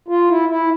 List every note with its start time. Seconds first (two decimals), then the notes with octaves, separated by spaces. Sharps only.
0.08 F4
0.29 E4
0.49 E4